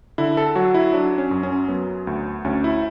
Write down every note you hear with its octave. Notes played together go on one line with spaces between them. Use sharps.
D3 E4
A4
F#3 F#4
E4
F#3 D4
C#4
F#2
C#4
F#3 B3
D2
D2 C#4
E4